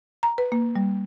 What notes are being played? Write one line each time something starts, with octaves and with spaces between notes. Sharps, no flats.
A#5
B4
A#3
G3